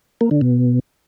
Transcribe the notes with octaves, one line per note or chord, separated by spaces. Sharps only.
A#3
D3
B2